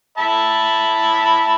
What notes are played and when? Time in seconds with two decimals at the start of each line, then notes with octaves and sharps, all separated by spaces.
0.18 E5 A5 B5